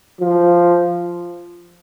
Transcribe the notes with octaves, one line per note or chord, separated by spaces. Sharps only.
F3